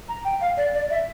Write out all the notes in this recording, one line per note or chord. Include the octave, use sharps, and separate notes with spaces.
A#5
G5
F5
D5
D5
E5